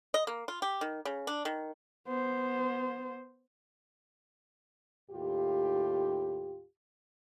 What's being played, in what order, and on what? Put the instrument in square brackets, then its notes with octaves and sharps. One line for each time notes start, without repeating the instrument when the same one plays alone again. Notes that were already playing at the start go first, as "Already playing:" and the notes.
[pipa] D#5
A#3
F4
G4
D#3
C#3
D4
D#3
[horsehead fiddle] B3 C5
[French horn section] D#2 A2 F4 G4